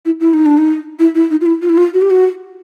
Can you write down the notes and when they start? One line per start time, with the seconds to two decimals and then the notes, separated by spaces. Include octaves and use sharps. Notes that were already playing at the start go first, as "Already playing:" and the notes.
0.06 E4
0.20 E4
0.34 D#4
0.46 D4
0.58 D#4
0.99 E4
1.15 E4
1.31 D#4
1.41 F4
1.46 E4
1.62 F4
1.70 E4
1.77 F4
1.94 F#4
2.02 G4
2.10 F#4